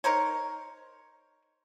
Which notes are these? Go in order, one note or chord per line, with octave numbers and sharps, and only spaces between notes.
D#4 A#4 C5 C#5